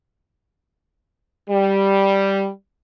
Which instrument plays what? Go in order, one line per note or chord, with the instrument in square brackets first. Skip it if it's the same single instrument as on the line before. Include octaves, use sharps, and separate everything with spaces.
[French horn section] G3